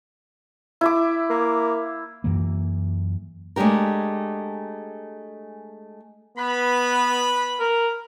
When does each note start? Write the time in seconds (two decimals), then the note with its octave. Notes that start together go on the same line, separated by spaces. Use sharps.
0.81 E4 E5 D6
1.30 A#3
2.24 F#2 E3 A#3
3.56 G#3 A3 D4 G4 A#4
6.38 B3 B4 B5
7.60 A#4